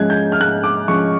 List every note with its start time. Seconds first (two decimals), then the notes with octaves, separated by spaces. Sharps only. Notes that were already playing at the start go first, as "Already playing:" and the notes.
Already playing: G#2 F3 G#3 C#4 F#6 G#6
0.10 G6
0.32 F6
0.41 G#2 F#6
0.64 D6
0.88 F3 G#3 C#4 C#6